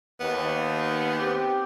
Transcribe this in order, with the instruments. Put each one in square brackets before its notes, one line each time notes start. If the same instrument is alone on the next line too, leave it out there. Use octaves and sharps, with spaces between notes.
[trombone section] D#2 [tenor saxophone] B3
[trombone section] C4 G4